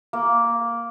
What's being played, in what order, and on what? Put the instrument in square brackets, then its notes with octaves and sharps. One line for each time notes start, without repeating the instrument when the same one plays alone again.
[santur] A#3